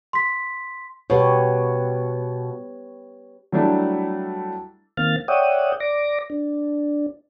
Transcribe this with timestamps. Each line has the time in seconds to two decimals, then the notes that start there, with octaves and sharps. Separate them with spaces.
0.13 C6 B6
1.10 B2 G4 B4 C#5
3.52 F#3 G3 A3 D4 E4
4.97 D#3 A#3 C4 F5 F6 A6
5.28 C#5 D5 E5 F#5 G5 D#6
5.80 D5 D6 A#6
6.30 D4